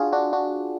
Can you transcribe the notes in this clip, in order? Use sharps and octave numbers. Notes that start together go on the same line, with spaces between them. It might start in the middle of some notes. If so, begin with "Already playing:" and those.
Already playing: D4 F4 F#4 G#4
D4 F#4
D4 F#4